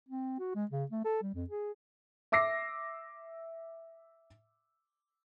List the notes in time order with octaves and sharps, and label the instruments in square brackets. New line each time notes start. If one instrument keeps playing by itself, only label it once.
[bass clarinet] C4
F#4
G#3
C#3
A3
A4
G3
F2
G#4
[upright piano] E5 D6 E6 A#6 C7